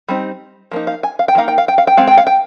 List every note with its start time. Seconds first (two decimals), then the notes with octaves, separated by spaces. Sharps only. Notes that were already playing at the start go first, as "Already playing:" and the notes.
0.08 G3 C4 D#4
0.71 F3 A#3 D#4
0.87 F5
1.03 G#5
1.19 F5
1.28 G5
1.35 F3 A#3 D#4 F5
1.48 G5
1.58 F5
1.68 G5
1.78 F5
1.87 G5
1.97 G#3 C4 F5
2.07 G5
2.17 F5
2.27 G5